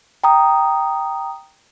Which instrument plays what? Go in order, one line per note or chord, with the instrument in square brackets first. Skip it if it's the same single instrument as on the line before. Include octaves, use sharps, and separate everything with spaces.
[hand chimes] G5 A#5 D#6